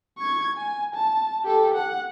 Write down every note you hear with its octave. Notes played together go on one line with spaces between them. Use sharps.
C#6 G#6
G#5
A5
G4 A4
F#5